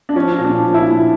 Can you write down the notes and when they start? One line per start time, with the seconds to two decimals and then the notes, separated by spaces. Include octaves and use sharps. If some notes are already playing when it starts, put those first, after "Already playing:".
0.09 D4
0.15 F3 C#4
0.38 A#2
0.44 D4
0.59 F3
0.74 E4
0.81 A#2